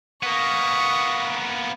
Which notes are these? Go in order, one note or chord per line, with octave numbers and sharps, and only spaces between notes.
A#3 B3 C#6 D#6